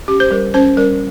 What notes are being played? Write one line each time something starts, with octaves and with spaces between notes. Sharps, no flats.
C#4 G4
C5
G3 A#4
C#4 C5
G3 A#4